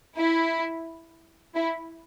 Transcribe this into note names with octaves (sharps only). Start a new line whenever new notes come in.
E4
E4